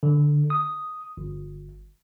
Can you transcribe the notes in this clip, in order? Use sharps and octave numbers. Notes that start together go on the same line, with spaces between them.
D3
D#6
G1